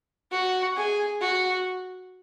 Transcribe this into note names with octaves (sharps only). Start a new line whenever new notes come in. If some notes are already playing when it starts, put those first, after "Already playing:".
F#4
G#4
F#4